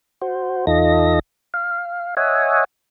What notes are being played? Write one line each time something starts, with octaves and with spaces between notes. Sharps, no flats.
F#4 C5
E2 D#4 F4 A4 D#5 A#6
F5
C#5 D#5 E5 F#5 G#5